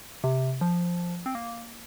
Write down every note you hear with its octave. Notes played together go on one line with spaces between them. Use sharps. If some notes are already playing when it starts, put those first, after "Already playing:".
C3
F3
C4
A#3